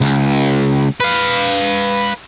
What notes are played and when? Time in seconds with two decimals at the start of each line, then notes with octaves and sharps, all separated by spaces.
0.01 C#2
1.00 B4 F5